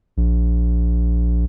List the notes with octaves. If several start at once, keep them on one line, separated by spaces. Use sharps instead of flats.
A#1